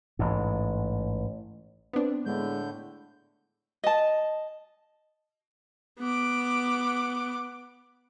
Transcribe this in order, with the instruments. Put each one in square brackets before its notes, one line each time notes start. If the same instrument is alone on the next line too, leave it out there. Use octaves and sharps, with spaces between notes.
[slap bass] A1 G#2
[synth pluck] B3 D4 [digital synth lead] C4
[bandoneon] A2 D3 G6 [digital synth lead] G#3
[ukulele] D#5 A5
[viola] B3 D6